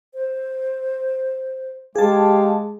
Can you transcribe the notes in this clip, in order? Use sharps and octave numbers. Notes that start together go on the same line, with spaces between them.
C5
G#3 G4 G#4 F5 A5